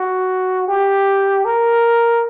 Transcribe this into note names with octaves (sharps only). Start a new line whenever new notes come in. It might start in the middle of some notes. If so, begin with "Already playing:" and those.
Already playing: F#4
G4
A#4